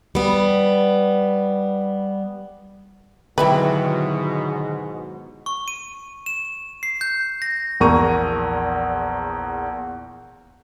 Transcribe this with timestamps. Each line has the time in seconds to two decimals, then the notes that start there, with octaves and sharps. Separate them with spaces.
0.15 G3 B3
3.38 G#2 B2 D3 D#3 F#3 E4 G4 B4
5.46 C#6
5.68 D#7
6.26 E7
6.83 C7
7.01 G6
7.42 A#6
7.80 A#1 E2 A#3 A#5 C#6 D#7